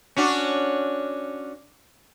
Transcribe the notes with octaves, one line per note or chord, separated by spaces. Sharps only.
C#4 D4 F#4